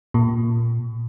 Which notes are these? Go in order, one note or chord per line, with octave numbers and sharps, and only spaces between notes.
A#2